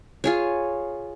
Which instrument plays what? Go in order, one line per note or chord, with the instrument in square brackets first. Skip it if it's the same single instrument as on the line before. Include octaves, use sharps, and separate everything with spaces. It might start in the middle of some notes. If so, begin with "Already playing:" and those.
[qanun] F4 G#4 C#5